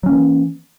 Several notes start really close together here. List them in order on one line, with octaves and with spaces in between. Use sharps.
F#3 C#4 A#3 E3